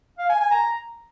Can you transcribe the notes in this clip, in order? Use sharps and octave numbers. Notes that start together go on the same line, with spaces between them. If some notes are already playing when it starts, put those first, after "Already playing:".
F5
G#5
G#5
A#5